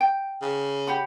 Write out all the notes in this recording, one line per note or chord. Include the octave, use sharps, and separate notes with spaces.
G5
C#3
G4 F#5 B5